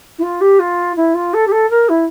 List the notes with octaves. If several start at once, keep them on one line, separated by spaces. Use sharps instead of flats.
E4
F4
G4
F4
E4
F4
A4
G4
A4
A#4
E4